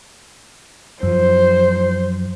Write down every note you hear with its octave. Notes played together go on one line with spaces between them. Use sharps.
F#2 F3 C5